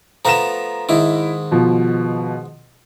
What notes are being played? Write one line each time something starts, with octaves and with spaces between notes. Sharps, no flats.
F3 A3 B3 A#5 A#6 E7
G#2 D#3 E4
B2 F3